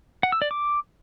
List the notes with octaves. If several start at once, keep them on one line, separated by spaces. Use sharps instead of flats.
F#5
E6
D5
D6